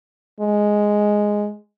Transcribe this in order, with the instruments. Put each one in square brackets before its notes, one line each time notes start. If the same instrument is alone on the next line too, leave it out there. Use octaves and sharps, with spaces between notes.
[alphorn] G#3